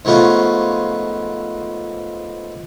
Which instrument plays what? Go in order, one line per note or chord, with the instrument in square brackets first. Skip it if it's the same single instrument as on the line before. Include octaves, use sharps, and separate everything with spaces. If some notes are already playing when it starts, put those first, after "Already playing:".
[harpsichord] G#2 F3 A3 B3 C#4 F4